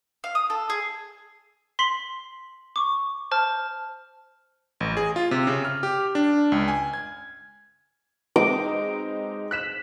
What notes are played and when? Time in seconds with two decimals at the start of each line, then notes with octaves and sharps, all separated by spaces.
0.24 F5
0.35 D#6
0.50 A4
0.70 G#4
1.79 C6 B6 C7 F#7
2.76 C#6 D6
3.31 C5 A5 F6
4.80 A1
4.97 G#4
5.16 F4
5.31 C3
5.47 C#3
5.65 F6
5.83 G4
6.15 D4
6.52 C#2
6.68 G#5
6.94 G#6
8.36 G#3 C4 D#4 D6
9.51 F#6 B6 E7